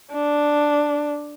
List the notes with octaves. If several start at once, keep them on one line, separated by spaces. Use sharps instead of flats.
D4